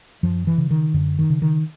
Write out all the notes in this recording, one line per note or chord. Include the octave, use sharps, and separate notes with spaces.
F#2 F3
E3
C#3
D#3
F#2 D3
D#3
C#3
D#3